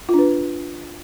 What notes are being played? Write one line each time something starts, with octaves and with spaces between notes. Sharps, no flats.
D4 F4 B4